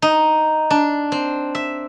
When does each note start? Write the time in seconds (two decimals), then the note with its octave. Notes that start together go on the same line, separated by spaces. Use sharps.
0.02 D#4
0.70 D4
1.12 C4
1.55 E5